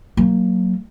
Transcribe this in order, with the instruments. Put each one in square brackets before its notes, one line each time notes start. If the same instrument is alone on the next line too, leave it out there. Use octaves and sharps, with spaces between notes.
[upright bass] F#3 A#3